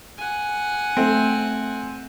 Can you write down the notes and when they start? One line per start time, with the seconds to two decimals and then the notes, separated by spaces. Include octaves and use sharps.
0.18 F#5 G#5
0.97 A3 C4